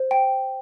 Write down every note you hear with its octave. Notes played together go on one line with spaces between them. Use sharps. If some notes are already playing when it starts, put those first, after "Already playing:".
Already playing: C5
G5